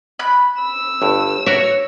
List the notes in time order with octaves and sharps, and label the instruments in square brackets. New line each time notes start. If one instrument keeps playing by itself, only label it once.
[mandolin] B5 F#6
[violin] E6
[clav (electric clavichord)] G1 G2
[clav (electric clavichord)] F#4 A#4 E5 [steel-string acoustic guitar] C#5